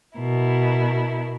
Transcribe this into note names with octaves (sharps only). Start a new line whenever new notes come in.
B2 E4 A#4